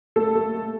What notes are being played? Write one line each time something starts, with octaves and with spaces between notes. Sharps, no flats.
A3 A4
A3
A3